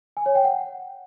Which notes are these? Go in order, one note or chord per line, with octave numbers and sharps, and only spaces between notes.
G#5
C#5
G5
F#5